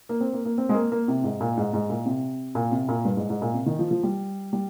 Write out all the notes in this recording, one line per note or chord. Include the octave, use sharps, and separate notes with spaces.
A#3
C4
A#3
A#3
C4
G#3
A#3
A#3
C3
G#2
A#2
G#2
G#2
A#2
C3
A#2
C3
A#2
G2
G#2
G#2
A#2
C3
D#3
F3
F3
G3
G3